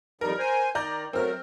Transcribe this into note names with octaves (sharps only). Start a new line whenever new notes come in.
F2 D#3 G3 A#4
C5 G#5
D#3 D5 A#5 G6
F#3 A3 C4 A#4 F6